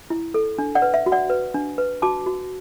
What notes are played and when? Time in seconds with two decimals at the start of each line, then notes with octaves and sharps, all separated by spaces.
0.10 E4
0.34 A4
0.58 D4
0.75 D5 F#5
0.82 B4
0.94 E5
1.06 F#4
1.12 D5 F#5
1.30 B4
1.54 D4
1.78 B4
2.02 F#4 A5 D6
2.26 F#4